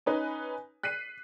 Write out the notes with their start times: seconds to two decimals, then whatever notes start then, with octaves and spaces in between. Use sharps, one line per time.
0.06 C#4 D#4 B4 G#5
0.83 F#6 B6 C7 D#7